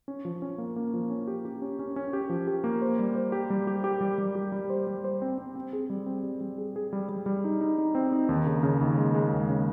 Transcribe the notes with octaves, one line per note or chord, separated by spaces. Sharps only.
C#4
F3
C#4
A#3
A#3
F3
C#4
G4
G4
C#4
C#4
C#4
G4
F3
G4
A#3
C5
G3
C5
G4
G3
G4
G4
G3
G3
G4
G3
C5
G3
C5
C4
C4
C4
G#4
G3
C4
G3
G3
G#4
G#4
G3
G3
G3
D#4
D#4
D#4
C4
D#4
D#2
C#3
C#3
D#2
G#3
G#3
D#2
C#3